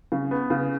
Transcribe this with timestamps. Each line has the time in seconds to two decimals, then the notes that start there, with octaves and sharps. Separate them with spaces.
0.12 C#3
0.31 B3
0.50 C#3